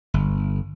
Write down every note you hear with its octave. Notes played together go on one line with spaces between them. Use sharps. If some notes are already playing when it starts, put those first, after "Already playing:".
G1